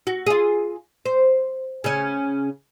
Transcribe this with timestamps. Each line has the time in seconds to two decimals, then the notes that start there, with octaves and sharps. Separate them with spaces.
0.07 F#4
0.27 F4 G#4
1.06 C5
1.84 C#3 C#4